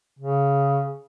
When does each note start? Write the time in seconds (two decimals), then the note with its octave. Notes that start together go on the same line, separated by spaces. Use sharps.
0.19 C#3